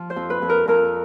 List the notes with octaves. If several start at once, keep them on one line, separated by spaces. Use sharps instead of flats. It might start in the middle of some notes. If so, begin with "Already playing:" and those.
Already playing: F3
C5
F2
B4
F2
A#4
F2 A#4